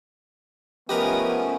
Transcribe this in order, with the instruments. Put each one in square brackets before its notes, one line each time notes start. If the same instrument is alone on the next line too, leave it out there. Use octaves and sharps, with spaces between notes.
[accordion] F3 A3 C#4 [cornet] B3 [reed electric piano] G4 [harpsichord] A#4 B4 D#5